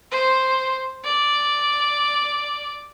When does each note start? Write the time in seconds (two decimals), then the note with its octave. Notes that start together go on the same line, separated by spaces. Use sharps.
0.11 C5
1.05 D5